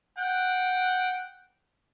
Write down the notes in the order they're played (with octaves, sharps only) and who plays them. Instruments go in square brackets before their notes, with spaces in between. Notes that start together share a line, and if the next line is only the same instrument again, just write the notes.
[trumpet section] F#5 G5